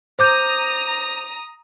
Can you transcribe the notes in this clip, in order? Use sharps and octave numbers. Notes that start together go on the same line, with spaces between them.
C5 A#5 D6 D#6 G6